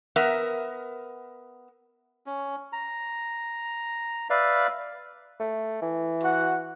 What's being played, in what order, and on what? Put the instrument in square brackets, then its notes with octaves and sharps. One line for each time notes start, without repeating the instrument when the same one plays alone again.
[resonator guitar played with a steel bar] B3 A#4 E5
[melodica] C#4
A#5
B4 D5 E5 F5
[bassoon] A3
E3
[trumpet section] F#4 F#5